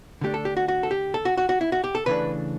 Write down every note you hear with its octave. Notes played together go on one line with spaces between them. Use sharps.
D3 A3 D4 G4
A4
G4
F#4
F#4
A4
G4
A4
F#4
F#4
F#4
E4
F#4
G4
A4
C#3 E3 A3 D4 B4